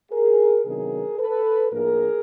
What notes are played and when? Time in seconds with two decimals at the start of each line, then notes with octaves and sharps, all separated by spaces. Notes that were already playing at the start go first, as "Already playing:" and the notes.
0.12 G#4 A#4
0.65 C3 D#3 F#3 B3 D4 G#4 A#4
1.19 A4 B4
1.72 A2 F3 A#3 D4 G#4 A#4